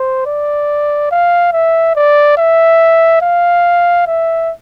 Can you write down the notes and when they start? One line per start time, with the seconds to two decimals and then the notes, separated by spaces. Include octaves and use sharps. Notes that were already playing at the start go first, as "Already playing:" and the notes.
Already playing: C5
0.26 D5
1.11 F5
1.53 E5
1.96 D5
2.38 E5
3.22 F5
4.07 E5